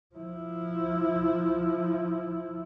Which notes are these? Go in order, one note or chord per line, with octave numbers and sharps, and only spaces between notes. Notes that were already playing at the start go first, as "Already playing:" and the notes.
F3 E4